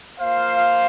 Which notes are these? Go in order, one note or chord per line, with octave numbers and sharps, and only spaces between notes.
A#3 F4 C5 F5